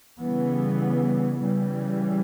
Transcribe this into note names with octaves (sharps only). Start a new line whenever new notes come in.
C#3 E3 G3 B3
C#3 E3 G3